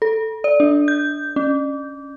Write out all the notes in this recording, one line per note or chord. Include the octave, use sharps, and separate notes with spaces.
A4
D5
D4
G6
C#4